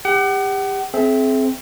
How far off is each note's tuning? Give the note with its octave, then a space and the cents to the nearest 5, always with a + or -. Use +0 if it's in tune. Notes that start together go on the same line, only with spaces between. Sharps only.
G4 +30 F#5 +40
C4 +0 G#4 +35 E5 +0